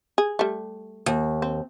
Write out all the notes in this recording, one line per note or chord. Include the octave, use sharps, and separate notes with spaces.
G#4
G3 A3
D#2
C4